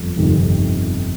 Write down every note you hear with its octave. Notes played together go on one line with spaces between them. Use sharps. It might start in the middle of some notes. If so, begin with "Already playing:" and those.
Already playing: G1 F2
G1 F2 C3 D#3